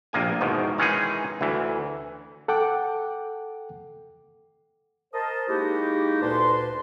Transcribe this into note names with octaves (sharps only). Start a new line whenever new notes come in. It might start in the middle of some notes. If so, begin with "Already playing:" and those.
A#1 C3 A#3 G#5
E2 G#2 B2 D#3
D#3 E3 G#3 C#4 D#4 G#4
D2 E3
A4 F#5 G5 D6
A#4 C5 D#5 A5
G#3 A#3 D#4 E4 F#4 G4
D2 A#2 B4 D5 A5 C6